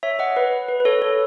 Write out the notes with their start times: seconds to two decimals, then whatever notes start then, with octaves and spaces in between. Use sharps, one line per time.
0.03 C#5 E5
0.19 D#5 F#5
0.36 B4
0.68 B4
0.80 B4
0.85 A4 C#5
1.02 A4 C#5